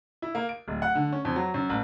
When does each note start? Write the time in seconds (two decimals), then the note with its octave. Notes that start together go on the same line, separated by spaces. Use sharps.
0.22 E4
0.35 A#3
0.49 D7
0.68 D1
0.82 F#5
0.95 D3
1.12 C#4
1.25 F2
1.36 F#3
1.54 F#2
1.69 A1